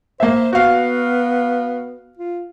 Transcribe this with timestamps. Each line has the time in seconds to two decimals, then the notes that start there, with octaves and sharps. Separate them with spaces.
0.20 A#3 C5 E5
0.53 B3 F#4 F5
2.17 F4